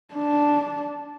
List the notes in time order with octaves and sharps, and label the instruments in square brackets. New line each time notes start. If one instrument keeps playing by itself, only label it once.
[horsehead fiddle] D4